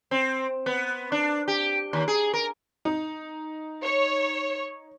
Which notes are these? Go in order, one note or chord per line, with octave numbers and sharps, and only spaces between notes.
C4
B3
D4
G4
D#2
G#4
A#4
D#4
C#5